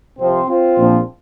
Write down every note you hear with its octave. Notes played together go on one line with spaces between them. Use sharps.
C2 C3 F3 C4
C4 F4
A#1 A#2 F3